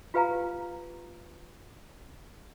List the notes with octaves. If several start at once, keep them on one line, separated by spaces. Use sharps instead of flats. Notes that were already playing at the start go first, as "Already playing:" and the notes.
F4 G4 B4 F5 G#5 A#5